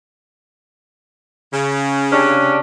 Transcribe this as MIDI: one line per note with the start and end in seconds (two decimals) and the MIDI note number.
1.52 2.56 49
2.12 2.59 48
2.12 2.59 61
2.12 2.59 62